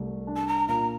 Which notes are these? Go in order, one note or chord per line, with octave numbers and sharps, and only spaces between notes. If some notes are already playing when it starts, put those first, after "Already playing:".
Already playing: C2 A3
D4
A5
A#5
A#2 A#5